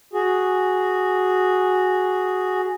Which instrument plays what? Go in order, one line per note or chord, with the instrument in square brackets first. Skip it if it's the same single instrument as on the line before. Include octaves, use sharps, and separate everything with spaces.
[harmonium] F#4 G#4